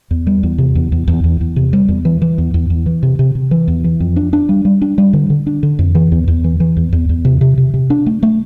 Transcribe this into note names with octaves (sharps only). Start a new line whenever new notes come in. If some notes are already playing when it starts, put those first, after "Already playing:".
E2
G3
E2
C3
E2
E2
E2
E2
E2
C3
G3
E2
E3
E3
E2
E2
E2
E3
C3
C3
C3
E3
E2
E3
F2
D4
D4
G3
G3
D4
G3
D3
D3
D4
D3
F2
E3
E2
E2
E3
E3
E2
E2
E2
C3
C3
C3
C3
D4
A3
A3